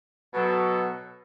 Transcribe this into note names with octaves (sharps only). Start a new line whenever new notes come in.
B2 F#3 A4